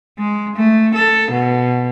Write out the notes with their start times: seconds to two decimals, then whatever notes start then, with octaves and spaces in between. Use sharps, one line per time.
0.18 G#3
0.56 A3
0.95 A4
1.32 B2